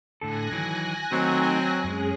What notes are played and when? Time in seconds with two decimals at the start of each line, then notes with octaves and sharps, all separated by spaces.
0.21 A2 D3 A4 G#5 F#6 A#6
0.51 D#3 E3 F#3
1.12 D#3 F#3 A3 C4 D#4
1.84 F#2 G#3 C#4 G#4